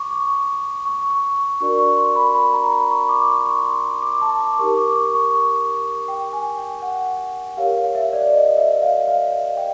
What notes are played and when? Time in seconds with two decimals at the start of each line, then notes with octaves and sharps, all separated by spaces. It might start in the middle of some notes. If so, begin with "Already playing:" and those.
Already playing: C#6 D6
0.10 C#6
0.85 C#6
1.10 C#6
1.60 D4 F#4 A#4 D5 C#6
1.79 C#6
1.97 C6
2.16 B5
2.34 B5
2.53 A#5
2.72 B5
2.91 C#6
3.09 D6
3.28 C#6
3.46 C6
3.65 C6
4.02 D6
4.21 A5
4.40 D6
4.59 D#4 G4 A#4 C#6
4.77 D6
4.96 C#6
5.14 C#6
6.08 G5
6.33 G#5
6.58 G5
6.82 F#5
7.57 G4 A#4 C#5 F5
7.77 F5
7.95 E5
8.13 D5
8.32 D#5
8.57 E5
8.82 F5
9.07 F5
9.57 G5